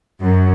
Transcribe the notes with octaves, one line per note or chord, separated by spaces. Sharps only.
F#2